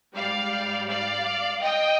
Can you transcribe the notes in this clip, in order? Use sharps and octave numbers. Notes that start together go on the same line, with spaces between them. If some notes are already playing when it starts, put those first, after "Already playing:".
G#2 G3 D5 F5
D5 F5
D#5 G5